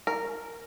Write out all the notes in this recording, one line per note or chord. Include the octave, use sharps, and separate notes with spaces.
A#4